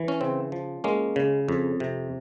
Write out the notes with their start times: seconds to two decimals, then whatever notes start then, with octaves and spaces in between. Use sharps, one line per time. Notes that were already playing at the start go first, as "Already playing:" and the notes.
Already playing: E3
0.08 C#4
0.21 C#3 C4
0.52 F3
0.84 G#3 A#3 C#4
1.16 C#3
1.49 F2
1.80 C3